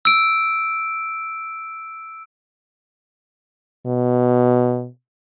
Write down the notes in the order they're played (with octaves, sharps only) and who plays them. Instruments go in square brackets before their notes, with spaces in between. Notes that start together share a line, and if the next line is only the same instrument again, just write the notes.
[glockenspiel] E6 D7
[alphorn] B2